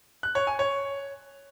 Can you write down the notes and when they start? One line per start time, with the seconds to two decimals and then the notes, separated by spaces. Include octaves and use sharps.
0.23 F#6
0.35 C#5
0.47 G#5
0.59 C#5